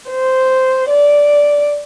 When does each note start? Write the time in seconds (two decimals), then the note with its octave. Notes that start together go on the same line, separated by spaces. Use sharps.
0.10 C5
0.90 D5